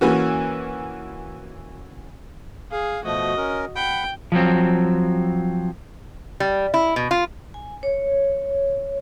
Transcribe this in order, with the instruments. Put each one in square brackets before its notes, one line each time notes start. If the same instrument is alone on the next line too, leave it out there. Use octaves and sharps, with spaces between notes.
[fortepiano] E3 A#3 C#4 F#4
[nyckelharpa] G#4 [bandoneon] F5
[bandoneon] B2 F3 A3 [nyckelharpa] F#4 D#5
[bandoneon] C#4 A#4
[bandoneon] F#5 B5 [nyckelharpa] G5
[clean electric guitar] F3 F#3 C4
[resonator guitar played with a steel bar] G3
E4
B2
F4
[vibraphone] G#5
C#5